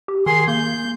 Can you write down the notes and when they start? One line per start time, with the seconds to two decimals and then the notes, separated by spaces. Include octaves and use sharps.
0.08 G4
0.26 D#3 G#4 C6
0.48 A#3 G6